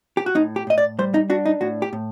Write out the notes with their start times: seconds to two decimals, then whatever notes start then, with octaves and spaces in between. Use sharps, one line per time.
0.17 G4
0.26 F#4
0.35 A2 D#4
0.56 G4
0.67 A2 D#5
0.78 D5
0.99 G3 C5
1.14 D#4
1.30 D4 F#4
1.46 D#4
1.61 A2 F#4
1.82 G4
1.93 A2